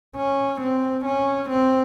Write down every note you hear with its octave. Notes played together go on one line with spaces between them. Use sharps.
C#4
C4
C#4
C4